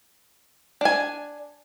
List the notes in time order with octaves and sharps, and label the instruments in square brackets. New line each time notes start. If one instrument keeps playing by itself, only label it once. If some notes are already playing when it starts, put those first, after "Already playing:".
[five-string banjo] D4 G#5